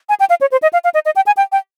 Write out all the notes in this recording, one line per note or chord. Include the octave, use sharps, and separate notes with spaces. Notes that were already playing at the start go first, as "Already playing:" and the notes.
G#5
G5
F5
C#5
C5
D#5
F5
F5
D#5
D#5
G5
G#5
G5
G5